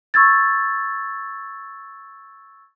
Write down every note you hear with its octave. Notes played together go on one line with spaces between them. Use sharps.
C#6 E6 G#6 A6